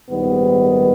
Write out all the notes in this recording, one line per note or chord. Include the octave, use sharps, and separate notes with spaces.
A#1 G#2 D#3 G3 B3